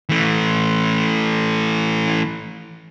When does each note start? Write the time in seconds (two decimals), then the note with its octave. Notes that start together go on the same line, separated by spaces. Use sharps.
0.09 E3 A3